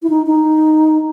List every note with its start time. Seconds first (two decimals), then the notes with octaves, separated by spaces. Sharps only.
0.03 E4
0.10 D#4
0.26 D#4